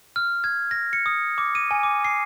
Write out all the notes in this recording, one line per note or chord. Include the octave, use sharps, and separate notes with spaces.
F6
G#6
A#6
C#7
D#6
D6
D#7
G#5
D6
C7